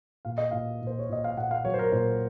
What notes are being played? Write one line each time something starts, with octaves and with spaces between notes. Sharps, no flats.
A#2 F5
D#5
A#2 F5
A#2
C5
C#5
A#2 D#5
F5
A#2 F#5
F5
F#3 C#5
C5
A#4
A#2 C5